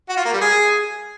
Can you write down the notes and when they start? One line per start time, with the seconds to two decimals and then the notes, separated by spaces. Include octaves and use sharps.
0.09 F#4
0.17 F4
0.25 A#3
0.33 G3
0.41 G#4